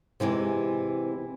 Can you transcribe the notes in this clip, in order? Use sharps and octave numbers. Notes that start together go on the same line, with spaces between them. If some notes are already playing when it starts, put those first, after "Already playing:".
C3 E3 G#3 C4